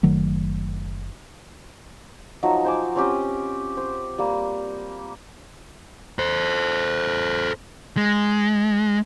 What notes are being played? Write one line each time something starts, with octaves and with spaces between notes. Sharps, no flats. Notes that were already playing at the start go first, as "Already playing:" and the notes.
F#1 D#3 F#3 A3
F3 F#3 D#4
C5 G#5 D6
C4 C#4 G4 D#6
C5
G3 A#3
A4 C5
G#3